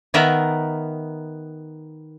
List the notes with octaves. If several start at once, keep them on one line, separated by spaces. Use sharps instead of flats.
D#3 B3 A#4 E5 A#5